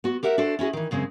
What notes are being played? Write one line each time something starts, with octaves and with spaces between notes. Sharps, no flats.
B3 F#4
G4 A#4 E5 F#5
D4 F#4 A4 C5
C#4 E4 F#4 G#4
D#3 E3
F#2 C#3 G#3 C4